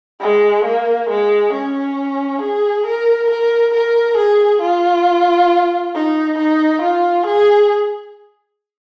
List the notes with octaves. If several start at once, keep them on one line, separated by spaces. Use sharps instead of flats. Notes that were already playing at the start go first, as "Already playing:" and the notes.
G#3
A#3
G#3
C#4
G#4
A#4
A#4
A#4
G#4
F4
D#4
D#4
F4
G#4